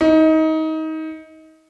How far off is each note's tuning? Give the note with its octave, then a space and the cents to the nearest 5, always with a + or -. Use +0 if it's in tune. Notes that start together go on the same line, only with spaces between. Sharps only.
D#4 +25